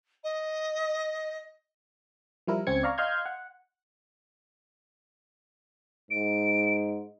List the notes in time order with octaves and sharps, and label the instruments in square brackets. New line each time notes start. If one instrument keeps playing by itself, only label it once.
[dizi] D#5
[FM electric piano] F3 G3 E4 A#4
C#2 C4 C#4 G#6 C#7
D5 F5 A#5 C#6
D#5 F5 C6 F6 G6 G#6
F#5
[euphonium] G#2 [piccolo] D7